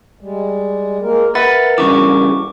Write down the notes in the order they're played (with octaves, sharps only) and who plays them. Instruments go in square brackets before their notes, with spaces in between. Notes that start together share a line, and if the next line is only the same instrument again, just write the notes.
[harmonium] G3 G#3
G#3 A#3 A#4
[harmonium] A#4 [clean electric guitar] B4 [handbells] E5 F#5 A6
[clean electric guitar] G2 C#3 E3 [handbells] C#6 D6